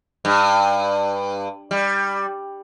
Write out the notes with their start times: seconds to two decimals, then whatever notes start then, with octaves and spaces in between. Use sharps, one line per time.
0.25 G2
1.71 G3